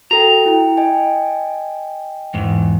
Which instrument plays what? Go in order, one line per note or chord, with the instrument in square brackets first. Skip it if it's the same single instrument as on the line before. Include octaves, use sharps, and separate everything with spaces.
[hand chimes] F#4 A4 G5 [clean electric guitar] A#5
[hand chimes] E4 G5
D#5 G5 G#5
[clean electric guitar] E2 G#2